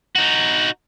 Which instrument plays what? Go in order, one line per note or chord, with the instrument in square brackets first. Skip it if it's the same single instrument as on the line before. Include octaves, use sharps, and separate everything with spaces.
[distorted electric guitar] D#4 F#4